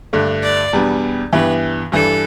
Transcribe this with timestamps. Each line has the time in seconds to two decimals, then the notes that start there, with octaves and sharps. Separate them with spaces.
0.13 G2 D3 A3 D4
0.43 D5
0.73 E2 B2 G3 B3 D4
1.33 G2 E3 B3 E4 G4 B4
1.92 G2 E3 G3 D4 A4